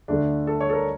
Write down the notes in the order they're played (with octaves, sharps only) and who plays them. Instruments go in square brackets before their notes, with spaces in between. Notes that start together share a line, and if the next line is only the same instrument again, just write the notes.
[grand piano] D2 D3 A3 D4
A4
C#5
A4
A#4